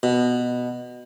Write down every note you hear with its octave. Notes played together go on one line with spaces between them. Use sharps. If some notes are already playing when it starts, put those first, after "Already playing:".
B2